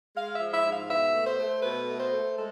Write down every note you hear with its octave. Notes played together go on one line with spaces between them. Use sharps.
G#3 F5
E5
F3
E5
G#2
F5
B2 E5
A3
C5
A3
B2 B4
A3
C5
A3
G#3 A4